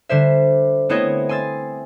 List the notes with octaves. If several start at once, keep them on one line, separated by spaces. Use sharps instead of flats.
D3 G3 C5 E5
A3 B3 C4 E4 C#5 D#5
G#5 C6 E6 A6